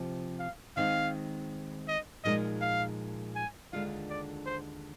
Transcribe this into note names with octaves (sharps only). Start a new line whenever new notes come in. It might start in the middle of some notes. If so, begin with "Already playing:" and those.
Already playing: C3 F3 G4
F5
D#3 G#3 C4 D#4 F5
D#5
A#2 F3 G#3 D#4 A#4 D#5
F5
G#5
D#2 D3 G#3 D4 F4 F5
D5
C5